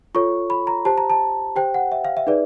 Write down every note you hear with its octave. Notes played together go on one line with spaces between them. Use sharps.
F4 A4 C#5 C#6
B5
A#5
G4 C5 A5
A#5
A5
G4 C5 G5
F#5
E5
F5
E5
D#4 G#4 B4 D5